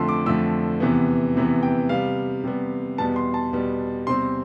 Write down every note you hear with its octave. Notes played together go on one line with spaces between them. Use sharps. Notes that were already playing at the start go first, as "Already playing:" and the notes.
Already playing: F2 D3 F3 A3 C6
D6
F2 D3 F3 A3 E6
E2 C3 E3 B3
E2 C3 E3 B3
G5
C3 G3 B3 F5
C3 G3 B3
E2 B2 G3 B3 A5
C6
A5
E2 B2 G3 B3
E2 C3 G3 C4 C6